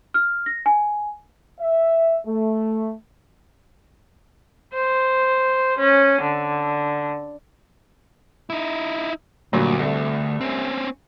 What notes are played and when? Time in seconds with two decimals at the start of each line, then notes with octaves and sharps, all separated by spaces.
0.14 F6
0.46 A#6
0.66 G#5
1.60 E5
2.26 A3
4.74 C5
5.79 C#4
6.21 D3
8.50 D#4 E4
9.53 D2 G2 A#2 F#3
9.79 C2 A3
10.41 C4 C#4